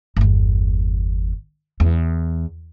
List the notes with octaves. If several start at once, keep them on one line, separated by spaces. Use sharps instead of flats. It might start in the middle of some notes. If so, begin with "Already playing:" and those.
G1 E2
E2